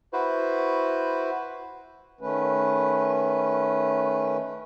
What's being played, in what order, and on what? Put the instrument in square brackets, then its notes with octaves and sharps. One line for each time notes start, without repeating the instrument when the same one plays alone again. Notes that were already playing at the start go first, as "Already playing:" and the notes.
[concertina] E4 F#4 B4 C5
[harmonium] D#3 A3 C#4 B4